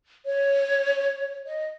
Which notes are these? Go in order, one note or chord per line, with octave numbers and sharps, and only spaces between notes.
C#5
D#5